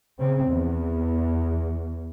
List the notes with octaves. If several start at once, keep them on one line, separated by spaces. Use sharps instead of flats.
C#3 C4
E2